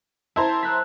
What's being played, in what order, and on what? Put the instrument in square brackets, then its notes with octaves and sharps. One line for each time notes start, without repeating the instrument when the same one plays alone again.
[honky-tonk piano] E4 C5 A#5 [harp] A5 G#6
[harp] E6 F#6 B6